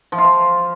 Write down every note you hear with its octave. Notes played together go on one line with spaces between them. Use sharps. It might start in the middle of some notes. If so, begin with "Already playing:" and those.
F3
F4
F3